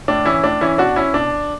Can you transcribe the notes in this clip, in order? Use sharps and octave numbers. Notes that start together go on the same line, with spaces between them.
A2 D4
E3 C#4 E4
A2 D4
E3 C#4 E4
B2 D4 F#4
C#4 E4
B2 D4